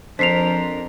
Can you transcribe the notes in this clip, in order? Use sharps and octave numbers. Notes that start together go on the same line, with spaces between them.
F2 F3 D4 A#4 B6 C7 F7